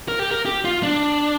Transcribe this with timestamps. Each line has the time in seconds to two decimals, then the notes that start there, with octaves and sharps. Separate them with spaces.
0.08 A#4
0.19 G4
0.31 A#4
0.45 G4
0.65 F4
0.83 D4